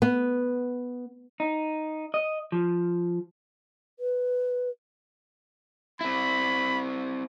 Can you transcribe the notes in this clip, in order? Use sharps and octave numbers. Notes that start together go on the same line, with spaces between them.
B3
D#4
D#5
F3
B4
C4 E4 B5